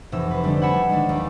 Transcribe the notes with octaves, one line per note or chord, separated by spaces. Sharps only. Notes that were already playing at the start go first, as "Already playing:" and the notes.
F1 E3 E6
B4 C5
D3 G3 A3 D4 D#4
F#5 G#5 B5 E6 C#7 E7
D#3 G#3 D4
D#2